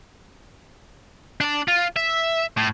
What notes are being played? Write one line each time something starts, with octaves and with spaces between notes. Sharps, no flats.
D4 D5
F4
E5
A2